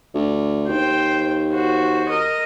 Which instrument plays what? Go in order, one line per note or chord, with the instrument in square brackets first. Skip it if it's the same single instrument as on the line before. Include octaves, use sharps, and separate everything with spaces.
[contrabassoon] D2
[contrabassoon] D#2 [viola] C5 G5
[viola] F#4 C5
A#4 D#5